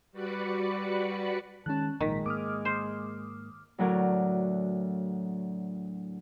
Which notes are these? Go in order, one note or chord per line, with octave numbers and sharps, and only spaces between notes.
G3 F#4 B4 D5 B5 C#7
D#3 G#3 C#4 A5 F#6
G#1 A#2 D#3 F3 G#3 A#5 B6
G#2 A#3 D6 D#6 F6
C5
D2 A2 F#3 A3 A#4 D5